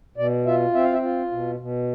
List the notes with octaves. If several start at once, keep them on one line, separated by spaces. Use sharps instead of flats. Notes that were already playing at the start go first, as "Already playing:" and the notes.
B2 D5
F4 E5
C4 E5
F5
E5
F4
B2
B2